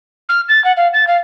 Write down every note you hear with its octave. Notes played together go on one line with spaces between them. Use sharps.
F6
A6
F#5
F5
A6
F5